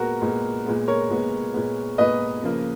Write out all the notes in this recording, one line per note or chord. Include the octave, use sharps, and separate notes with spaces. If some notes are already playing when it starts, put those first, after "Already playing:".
Already playing: A#2 G#3 B3 F#4 A#4
A#2 G#3 B3
A#2 G#3 B3
A#4 C#5
A#2 G#3 B3
A#2 G#3 B3
A#2 G#3 B3 B4 D#5
C#3 F3 A#3